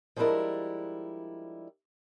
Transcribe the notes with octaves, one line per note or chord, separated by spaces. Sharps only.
F3 G3 G#3 D4 E4 A#4